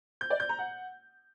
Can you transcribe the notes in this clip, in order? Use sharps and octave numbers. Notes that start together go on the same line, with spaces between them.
G6
D5
G6
A#5
F#5